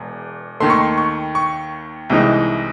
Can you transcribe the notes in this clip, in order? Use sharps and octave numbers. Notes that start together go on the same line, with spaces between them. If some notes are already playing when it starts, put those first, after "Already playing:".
Already playing: E1 E2
D#2 D#3 A3 C6
C#6
C6
C#6
C#6
C2 C3 E3 G#3 D#4